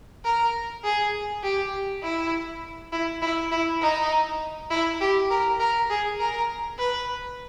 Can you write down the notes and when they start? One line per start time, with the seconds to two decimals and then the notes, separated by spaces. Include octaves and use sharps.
0.25 A#4
0.84 G#4
1.43 G4
2.03 E4
2.92 E4
3.22 E4
3.52 E4
3.82 D#4
4.70 E4
5.01 G4
5.30 A#4
5.60 A#4
5.90 G#4
6.19 A#4
6.79 B4